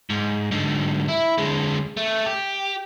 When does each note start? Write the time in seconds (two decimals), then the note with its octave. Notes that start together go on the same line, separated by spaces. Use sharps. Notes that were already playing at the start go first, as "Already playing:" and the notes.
0.10 G#2
0.51 G#2 D3
1.08 E4
1.38 D3 G#3
1.97 A3
2.26 G4